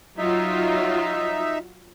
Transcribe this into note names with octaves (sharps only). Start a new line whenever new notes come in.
F#3 D#4 F4 E5